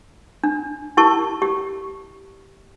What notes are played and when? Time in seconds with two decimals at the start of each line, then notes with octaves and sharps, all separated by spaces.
0.44 D4
0.97 E4 G4 A#4 A5 C#6
1.42 G4